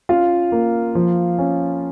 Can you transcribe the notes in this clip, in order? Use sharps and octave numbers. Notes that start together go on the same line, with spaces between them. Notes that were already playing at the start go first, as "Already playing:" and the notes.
C#4 F4 F5
A#3
F3
C#4